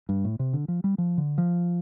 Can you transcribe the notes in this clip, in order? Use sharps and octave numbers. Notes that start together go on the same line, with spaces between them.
G2
A2
C3
D3
F3
G3
F3
D3
F3